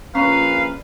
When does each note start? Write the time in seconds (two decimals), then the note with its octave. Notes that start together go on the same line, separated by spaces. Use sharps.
0.15 A#1 A#2 C#4 B4 F5 A#5